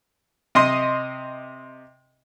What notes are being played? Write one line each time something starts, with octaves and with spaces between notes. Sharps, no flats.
C3 D#5 C6